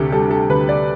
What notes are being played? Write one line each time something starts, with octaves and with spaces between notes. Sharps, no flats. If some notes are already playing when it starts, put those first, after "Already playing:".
Already playing: D2 C3 G4 A4
G3 A4
A4
D2 B4
D5